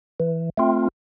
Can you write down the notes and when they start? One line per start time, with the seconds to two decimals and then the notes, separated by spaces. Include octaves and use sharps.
0.20 E3
0.57 A3 C4 F4